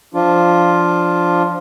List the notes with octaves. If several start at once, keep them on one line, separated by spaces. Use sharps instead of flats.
F3 D4 F4